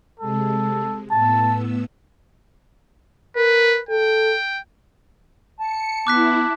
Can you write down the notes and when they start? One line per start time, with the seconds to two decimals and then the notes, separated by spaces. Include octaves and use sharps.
0.20 C3 G#3 A4
1.11 A2 B3 A5 E6
3.36 A#4 B4
3.89 A4 G5
5.60 A5 C#7
6.07 B3 E4 D6 F#6 B6